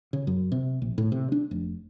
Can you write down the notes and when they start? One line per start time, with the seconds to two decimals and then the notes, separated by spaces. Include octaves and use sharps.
0.13 C#3
0.27 F#2
0.52 C3
0.82 A#1
0.98 A2
1.12 C3
1.32 D4
1.51 F1